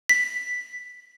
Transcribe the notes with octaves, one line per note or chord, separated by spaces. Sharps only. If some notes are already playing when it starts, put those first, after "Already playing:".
B6